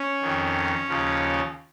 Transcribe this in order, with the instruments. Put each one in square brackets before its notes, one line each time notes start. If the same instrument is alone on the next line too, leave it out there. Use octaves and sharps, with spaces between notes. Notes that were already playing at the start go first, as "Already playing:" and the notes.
Already playing: [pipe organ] C#4
F2 D#3
D#2 C#3 F3